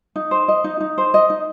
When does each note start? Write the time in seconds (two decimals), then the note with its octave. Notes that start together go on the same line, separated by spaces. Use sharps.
0.16 D#4
0.31 C5
0.48 D#5
0.64 D#4
0.80 D#4
0.98 C5
1.14 D#5
1.30 D#4